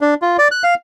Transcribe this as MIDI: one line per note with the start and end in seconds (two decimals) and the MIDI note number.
0.01 0.14 62
0.22 0.37 65
0.38 0.48 74
0.51 0.63 90
0.64 0.74 77